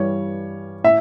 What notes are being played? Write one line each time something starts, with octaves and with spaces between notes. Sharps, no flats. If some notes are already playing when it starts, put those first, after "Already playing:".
Already playing: G2 E3 G3 C#5
A2 E5